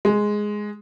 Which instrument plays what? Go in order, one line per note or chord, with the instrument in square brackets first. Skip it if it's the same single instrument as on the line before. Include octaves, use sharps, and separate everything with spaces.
[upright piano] G#3